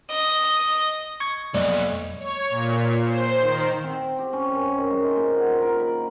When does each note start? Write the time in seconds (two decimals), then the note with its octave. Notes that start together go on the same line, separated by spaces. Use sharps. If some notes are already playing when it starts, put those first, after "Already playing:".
0.11 D#5
1.20 C#6 G#6
1.54 B1 F2 G#3 A#3 D5 D#5
2.18 C#5
2.50 A#2
3.05 C5
3.40 D#3
3.84 C4
4.19 G4
4.33 C#4
4.51 F#2
4.78 D#3
4.90 G#3
5.05 C5
5.17 A#2
5.35 F#5
5.62 A#4
5.79 B5